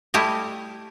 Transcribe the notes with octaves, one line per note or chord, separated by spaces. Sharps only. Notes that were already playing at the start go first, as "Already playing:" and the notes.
G3 A3 E4 G4 D#5